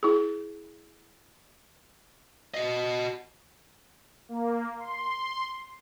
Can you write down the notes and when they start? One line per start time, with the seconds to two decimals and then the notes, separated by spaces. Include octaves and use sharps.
0.03 E4 G#4
2.54 F#4 D#5
4.29 A#3
4.79 C6